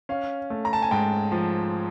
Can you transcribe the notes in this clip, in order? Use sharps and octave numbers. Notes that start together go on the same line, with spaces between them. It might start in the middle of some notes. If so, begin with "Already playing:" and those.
C#4 F5
A3
A#5
A5
G#5
G#2 G5
F3